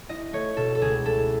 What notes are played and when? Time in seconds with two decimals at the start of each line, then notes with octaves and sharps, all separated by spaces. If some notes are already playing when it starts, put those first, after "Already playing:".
0.09 E4 D#5
0.33 A3 C#5
0.57 B2 A4
0.75 A4
0.81 C#2 G#4
1.05 E4 A4